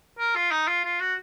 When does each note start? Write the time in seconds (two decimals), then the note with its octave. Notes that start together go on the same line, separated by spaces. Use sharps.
0.18 A#4
0.35 F4
0.51 D#4
0.67 F4
0.85 F4
1.00 F#4